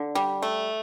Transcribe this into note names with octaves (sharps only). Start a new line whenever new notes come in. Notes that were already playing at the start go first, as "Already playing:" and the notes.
Already playing: D3
G3
A3